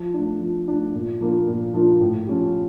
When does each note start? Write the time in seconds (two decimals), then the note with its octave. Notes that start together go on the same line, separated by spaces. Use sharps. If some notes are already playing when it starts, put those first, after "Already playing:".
Already playing: F3
0.14 A3 D4
0.41 F3
0.68 A3 D4
0.94 A#2
1.21 F3 A#3 D4 F4
1.47 A#2
1.74 F3 A#3 D4 F4
2.01 A2
2.27 F3 C#4 G4